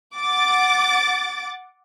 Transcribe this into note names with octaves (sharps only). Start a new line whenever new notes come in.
F#5 D6 A6